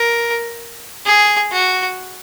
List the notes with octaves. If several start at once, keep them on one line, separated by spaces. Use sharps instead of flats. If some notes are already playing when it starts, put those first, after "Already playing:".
Already playing: A#4
G#4
F#4